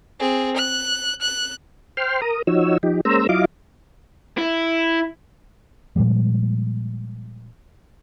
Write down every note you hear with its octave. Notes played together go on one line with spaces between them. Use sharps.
C4 G#4
F#6
F#6
C5 G5 C6 F6
A#4 A#5 D#6
F3 D#4 F#4 C#5 E6
F3 D#4 G4
G#3 A#3 C#4 C5 A#5 E6
F#3 E4 F4 D#5 F5 D6
E4
A#2 F3 G3 G#3